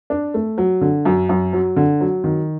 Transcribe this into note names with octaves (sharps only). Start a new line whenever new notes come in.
D4
A3
F#3
D3
F#2
F#2
F#3
D3
F#3
D#3